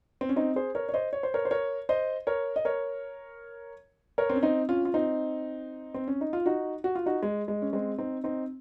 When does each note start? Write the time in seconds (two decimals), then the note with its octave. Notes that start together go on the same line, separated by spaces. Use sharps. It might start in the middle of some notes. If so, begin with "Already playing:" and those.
0.21 C4
0.29 C#4
0.36 C4 D#4
0.56 G#4 C5
0.75 A#4 C#5
0.89 C#5
0.94 C5 D#5
1.13 C#5
1.23 C5
1.34 A#4 C#5
1.45 C5
1.51 A#4 C#5
1.89 C5 D#5
2.27 A#4 C#5
2.56 D#5
2.65 A#4 C#5
4.18 A#4 C#5
4.30 C4
4.36 C#4
4.43 C4 D#4
4.69 C#4 F4
4.85 F4
4.94 C4 D#4
5.94 C4
6.08 C#4
6.21 D#4
6.33 F4
6.46 D#4 F#4
6.84 F#4
6.95 F4
7.06 D#4 F#4
7.22 G#3
7.48 G#3
7.62 C#4
7.73 G#3 C4
7.99 C4 D#4
8.24 C4 D#4